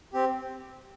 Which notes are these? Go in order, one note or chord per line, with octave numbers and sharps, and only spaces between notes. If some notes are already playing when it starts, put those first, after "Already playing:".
C4 G4